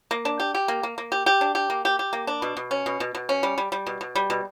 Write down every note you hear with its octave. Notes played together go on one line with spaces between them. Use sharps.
A#3
D4
G4
G4
A#3
A#3
A#3
G4
G4
D4
G4
A#3
G4
G4
A#3
D4
B2
B2
C#4
B2
B2
B2
C#4
G3
G3
G3
B2
B2
G3
B2